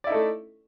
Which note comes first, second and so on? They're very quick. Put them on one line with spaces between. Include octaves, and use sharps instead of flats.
D5 E4 D#4 A4 A3